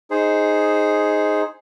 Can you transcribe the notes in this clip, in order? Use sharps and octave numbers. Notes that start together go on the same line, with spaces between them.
D#4 G#4 C5